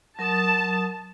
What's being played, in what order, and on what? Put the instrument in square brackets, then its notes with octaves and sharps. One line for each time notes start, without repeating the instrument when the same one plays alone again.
[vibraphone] F#3 A#4 D#6 [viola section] A5